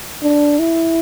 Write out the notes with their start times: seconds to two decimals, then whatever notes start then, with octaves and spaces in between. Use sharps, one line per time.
0.23 D4
0.59 E4